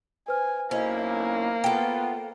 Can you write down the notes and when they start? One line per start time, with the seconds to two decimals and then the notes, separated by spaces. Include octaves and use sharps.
0.28 B4 C5 G#5 F6
0.71 B1 A#3 C#4 E4 C5 D#5
1.64 B3 F4 A4 G5